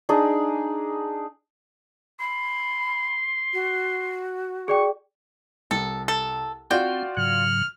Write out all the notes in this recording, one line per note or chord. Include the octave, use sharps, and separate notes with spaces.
D4 D#4 G#4 D5
B5 C6
F#4
G#4 D5 G5 C#6
C2 A4
A4
C4 F4 F#4 D5 G5
G#2 C#3 F#3 F6